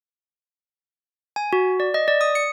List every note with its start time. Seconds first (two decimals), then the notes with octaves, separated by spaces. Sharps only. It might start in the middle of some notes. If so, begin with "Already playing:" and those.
1.36 G#5
1.53 F#4
1.80 D5
1.94 D#5
2.08 D5
2.21 D#6
2.35 C#7